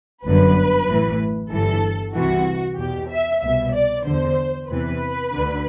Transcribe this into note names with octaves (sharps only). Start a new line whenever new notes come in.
G1 F#2 D3 B4
A1 A2 E3
G1 G2 E3 A4
C2 C3 E3 F#4
E2 B2 G4
E5
C2 B2 E5
D5
E2 D3 C5
E2 C3 E3 B4
D2 D3